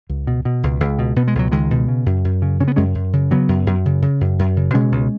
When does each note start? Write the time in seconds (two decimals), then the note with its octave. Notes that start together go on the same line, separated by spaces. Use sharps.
0.09 C#2
0.27 B2
0.45 B2
0.63 C#2
0.80 C#2
0.99 B2
1.16 B2 B3
1.28 G#3
1.35 C#2 F#3
1.52 C#2 D#3 G#3
1.71 B2
1.88 C#3
2.06 F#2
2.25 F#2
2.42 C#3
2.60 C#3 C#4
2.68 B3
2.76 F#2 G#3 C#4
2.95 F#2
3.13 C#3
3.31 C#3 F#3 B3
3.49 F#2
3.67 F#2
3.86 C#3
4.02 C#3
4.21 F#2
4.39 F#2
4.57 C#3
4.74 B2 G#3 C#4
4.92 C#2